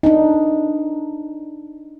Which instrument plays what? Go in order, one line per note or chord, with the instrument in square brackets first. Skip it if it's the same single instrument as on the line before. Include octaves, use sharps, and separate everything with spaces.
[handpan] D4 D#4